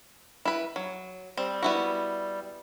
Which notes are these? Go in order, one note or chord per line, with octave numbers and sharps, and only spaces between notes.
E4 B4
F#3
G3 C4
B3 E4 F#4